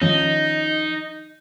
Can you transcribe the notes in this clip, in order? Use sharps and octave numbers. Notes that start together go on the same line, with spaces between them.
D#3 F3 C#4 D#4 D#5